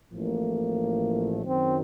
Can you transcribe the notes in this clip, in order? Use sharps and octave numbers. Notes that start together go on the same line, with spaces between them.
A1 A2 F3 A3 A#3
F#2 D#3 F#3 C4